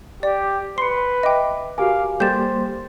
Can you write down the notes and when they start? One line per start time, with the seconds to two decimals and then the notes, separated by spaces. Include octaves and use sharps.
0.23 G4 D5
0.78 B4 C6 C7 C#7
1.23 D#5 E5 G5 D6
1.78 F#4 G4 A#4 F5 G#5 D6
2.20 G3 A#3 G4 A4 C5 G6 A6 E7